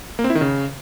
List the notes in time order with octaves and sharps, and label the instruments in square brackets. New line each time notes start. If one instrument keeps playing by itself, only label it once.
[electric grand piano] A#3
C4
E4
D#3
C#3